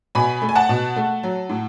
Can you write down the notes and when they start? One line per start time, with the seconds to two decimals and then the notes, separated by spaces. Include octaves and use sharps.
0.15 B2 G#5 B5
0.42 A3
0.49 G#5
0.55 F#5 A5
0.69 B2
0.96 A3
1.23 F#3
1.49 A2